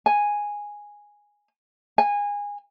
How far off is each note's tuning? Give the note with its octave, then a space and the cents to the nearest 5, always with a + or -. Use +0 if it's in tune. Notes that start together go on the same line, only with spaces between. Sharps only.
G#5 -5
G#5 -20